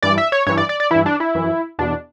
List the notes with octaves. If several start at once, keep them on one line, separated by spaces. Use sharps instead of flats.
G2 E3 D5
E5
C#5
G2 E3 C#5
D5
D5
D5
G2 E3 E4
D4
E4
F#2 E3
E2 B2 D4